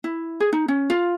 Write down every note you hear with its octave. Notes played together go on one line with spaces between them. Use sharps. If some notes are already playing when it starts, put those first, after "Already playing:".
E4
G#4
D#4
C#4
F4